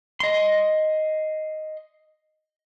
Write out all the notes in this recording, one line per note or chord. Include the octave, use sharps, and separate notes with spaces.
D#5 C6